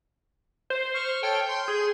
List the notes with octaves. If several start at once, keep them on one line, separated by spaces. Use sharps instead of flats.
C5
C#6 F6
A4 C#5 G5 F6
C6 G6
G#4